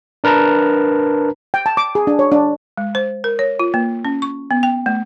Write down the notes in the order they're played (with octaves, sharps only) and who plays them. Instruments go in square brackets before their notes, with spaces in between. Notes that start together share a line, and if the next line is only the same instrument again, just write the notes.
[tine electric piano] D4 A#4 B4 A5 A#5
[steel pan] G5
A5
D6
G#4
D4
C#5
D4
[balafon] G#3
C5
A#4
C#5
F4
A#3
C#4
C#6
B3
G5
A3